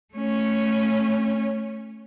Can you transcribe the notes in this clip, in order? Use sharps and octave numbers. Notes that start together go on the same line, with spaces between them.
A3 C#4